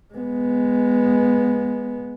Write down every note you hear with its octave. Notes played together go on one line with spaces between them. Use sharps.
G#3 B3